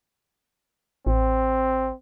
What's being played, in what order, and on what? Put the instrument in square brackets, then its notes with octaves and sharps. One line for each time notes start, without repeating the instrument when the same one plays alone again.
[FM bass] A1 [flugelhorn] C4